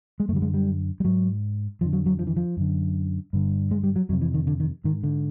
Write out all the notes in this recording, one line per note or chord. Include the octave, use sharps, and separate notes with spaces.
G#3
F#2 D3 G3 A3
G#3
G3
G3
G#2 F#3
F2 D3 F3
F#3
F#3
F3
E3
F3
F#2 D3
G2 D3
G#3
G3
F#3
F2 C3 F#3
E3
D#3
D3
D#3
G#2 D#3
D3